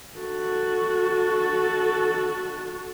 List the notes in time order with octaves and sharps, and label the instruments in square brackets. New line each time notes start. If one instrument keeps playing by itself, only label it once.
[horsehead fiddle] F#4 A4